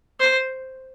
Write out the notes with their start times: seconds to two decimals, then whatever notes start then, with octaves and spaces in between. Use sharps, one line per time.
0.20 C5